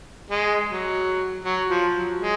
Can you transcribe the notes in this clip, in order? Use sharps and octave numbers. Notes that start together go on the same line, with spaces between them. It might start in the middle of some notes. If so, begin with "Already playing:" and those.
G#3
F#3
F#3
F3
F#3
G#3